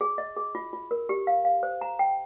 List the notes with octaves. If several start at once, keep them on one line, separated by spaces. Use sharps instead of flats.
G#4
D#5
G#4
F4
F4
A#4
G4
F5
F5
C5
A#5
G5